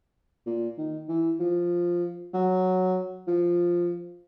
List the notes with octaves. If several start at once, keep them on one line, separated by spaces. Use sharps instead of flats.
A#2
D#3
E3
F3
F#3
F3